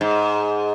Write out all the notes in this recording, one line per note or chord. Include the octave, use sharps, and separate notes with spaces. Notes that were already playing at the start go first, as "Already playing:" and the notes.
G#2